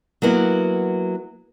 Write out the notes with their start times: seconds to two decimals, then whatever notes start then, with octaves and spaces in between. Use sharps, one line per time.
0.22 F#3 A#3 B3 E4